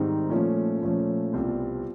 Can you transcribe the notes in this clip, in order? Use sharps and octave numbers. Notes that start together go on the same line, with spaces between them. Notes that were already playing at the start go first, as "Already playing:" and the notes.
Already playing: G#2 D#3 G3 C4 D#4
A#2 F3 A3 C#4
A#2 F3 A3 C#4
C2 B2 G3 C4 F4